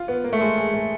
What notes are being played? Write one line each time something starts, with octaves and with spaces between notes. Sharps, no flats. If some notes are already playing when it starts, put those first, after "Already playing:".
Already playing: F4
B3
A#3
A3
G#3
G#3
A3